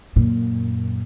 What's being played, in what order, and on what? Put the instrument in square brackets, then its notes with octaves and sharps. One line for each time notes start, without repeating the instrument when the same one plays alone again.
[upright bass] F#2 A#2